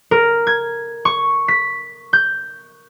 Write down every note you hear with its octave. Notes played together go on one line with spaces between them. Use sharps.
A#4
G#6
C#6
B6
G6